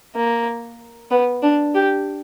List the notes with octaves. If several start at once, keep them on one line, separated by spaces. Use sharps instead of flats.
A#3
B3
D4
G4